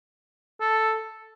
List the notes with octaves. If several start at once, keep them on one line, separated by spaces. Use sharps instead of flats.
A4